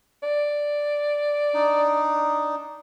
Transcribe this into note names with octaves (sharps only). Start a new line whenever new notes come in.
D5
D4 D#4